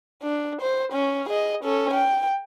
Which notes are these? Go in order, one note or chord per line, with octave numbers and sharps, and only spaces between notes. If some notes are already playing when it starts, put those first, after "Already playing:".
D4
C5
C#4
G#4 D#5
C#4 A4
G5